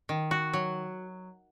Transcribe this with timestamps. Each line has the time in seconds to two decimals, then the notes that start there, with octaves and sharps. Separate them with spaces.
0.09 D#3
0.31 F#4
0.53 F#3